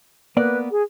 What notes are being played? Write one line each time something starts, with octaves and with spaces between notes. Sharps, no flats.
A#3 B3 B4 D5
G#4